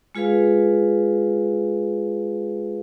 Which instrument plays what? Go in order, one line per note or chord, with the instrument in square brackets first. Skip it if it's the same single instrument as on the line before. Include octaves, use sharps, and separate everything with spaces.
[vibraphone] G#3 F4 G#4 B4 F5